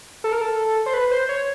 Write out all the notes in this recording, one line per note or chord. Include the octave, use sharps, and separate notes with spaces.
A4
A#4
A4
C5
B4
C5
C#5